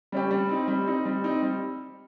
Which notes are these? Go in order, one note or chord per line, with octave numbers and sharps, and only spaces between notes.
G3 C#4 G4
G3
C4 D#4
G3
C4 D#4
G3
C4 D#4
G3